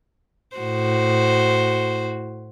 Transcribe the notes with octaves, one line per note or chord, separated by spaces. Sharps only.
A2 F#4 C5